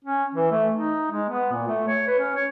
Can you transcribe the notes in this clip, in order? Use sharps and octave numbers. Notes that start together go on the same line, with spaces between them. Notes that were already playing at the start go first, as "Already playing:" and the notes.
C#4
E3
A3
D#4
G#3
B3
A#2
A3
C#5
B4
C#4
C#5